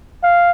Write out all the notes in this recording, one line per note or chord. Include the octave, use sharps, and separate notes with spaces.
F5